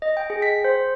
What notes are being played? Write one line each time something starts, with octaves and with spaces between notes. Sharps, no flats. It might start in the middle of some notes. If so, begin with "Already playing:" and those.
D#5
G5
G#4
B6
C5